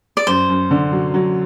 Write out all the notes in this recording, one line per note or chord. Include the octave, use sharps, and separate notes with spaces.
D5
F#2 C5
F#2
D3
F#3
F#3